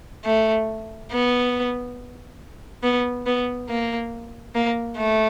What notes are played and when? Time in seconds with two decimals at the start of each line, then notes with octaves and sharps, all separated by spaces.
0.25 A3
1.12 B3
2.83 B3
3.26 B3
3.69 A#3
4.55 A#3
4.98 A3